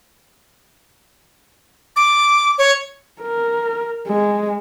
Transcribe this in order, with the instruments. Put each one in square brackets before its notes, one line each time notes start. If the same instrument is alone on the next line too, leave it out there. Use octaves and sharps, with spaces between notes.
[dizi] D6
C#5
[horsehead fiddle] A#4
G#3